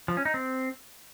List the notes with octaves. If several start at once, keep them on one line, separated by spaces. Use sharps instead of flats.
F3
C#4
D#4
C4